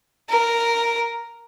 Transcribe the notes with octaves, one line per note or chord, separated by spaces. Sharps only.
A#4